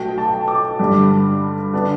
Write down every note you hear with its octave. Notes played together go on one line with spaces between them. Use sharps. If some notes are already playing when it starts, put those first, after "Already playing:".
Already playing: B1 B2 A3 G5
A5
D6
G2 D3 G3
D3 B3 D4